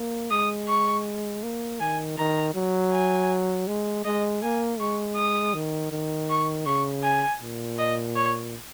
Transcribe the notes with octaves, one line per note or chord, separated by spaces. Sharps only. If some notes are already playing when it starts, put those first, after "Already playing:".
Already playing: A#3
G#3 D#6
C#6
A#3
D#3 G#5
D#3 A#5
F#3
G#5
G#3
G#3 D#5
A#3 G#5
G#3 C#6
D#6
D#3
D#3
C#6
C#3 C#6
G#5
A#2
D#5
C#5